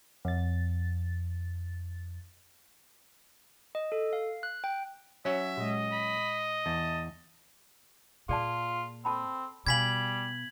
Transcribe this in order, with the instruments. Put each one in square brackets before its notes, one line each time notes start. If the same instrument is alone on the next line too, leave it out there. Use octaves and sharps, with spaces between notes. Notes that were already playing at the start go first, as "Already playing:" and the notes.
[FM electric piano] F2 A6
[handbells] D#5
A4
F5
F#6
G5
[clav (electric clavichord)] F#3 C#4 F#4 [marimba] C#5 [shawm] E5
[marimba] A#2 G#3 [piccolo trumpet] D#5
[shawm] B5
[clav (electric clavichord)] E2 [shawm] A5
[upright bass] A#2 [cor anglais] F4 [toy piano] G#4 D5 A5
[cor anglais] C4 [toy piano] A4 A5 B5
[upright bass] B2 [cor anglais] G3 [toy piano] F5 G#5 B5 [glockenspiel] G#6 B6 F#7